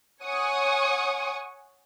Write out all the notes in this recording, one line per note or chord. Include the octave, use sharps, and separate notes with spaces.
C#5 F#5 G#5 C#6 D#6